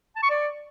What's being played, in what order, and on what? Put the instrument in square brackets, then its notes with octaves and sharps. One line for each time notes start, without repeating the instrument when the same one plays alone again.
[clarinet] A5
C#6
D5